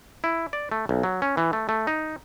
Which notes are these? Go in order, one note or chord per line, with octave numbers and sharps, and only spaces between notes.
E4
D5
A3
B1
F#3
C#4
E3
A3
A3
D#4